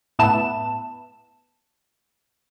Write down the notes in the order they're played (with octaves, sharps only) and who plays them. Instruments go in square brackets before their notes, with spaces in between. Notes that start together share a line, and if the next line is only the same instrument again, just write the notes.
[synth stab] A2 B3 B4 E5 A5 E7